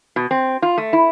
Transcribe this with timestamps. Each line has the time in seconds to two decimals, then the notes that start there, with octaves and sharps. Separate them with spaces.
0.16 B2
0.31 C4
0.62 F4
0.78 A3
0.93 E4